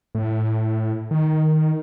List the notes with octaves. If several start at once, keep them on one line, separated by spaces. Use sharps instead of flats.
A2
D#3